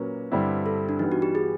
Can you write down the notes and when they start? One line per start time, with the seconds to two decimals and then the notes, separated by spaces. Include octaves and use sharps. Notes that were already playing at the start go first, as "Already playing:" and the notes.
Already playing: A#2 F#3 A#3 C#4 F#4 B4
0.32 G2 D3 G3 C4 E4
0.66 A4
0.89 D4
0.99 E3 G3 B3 D#4
1.12 F#4
1.22 G4
1.35 G#4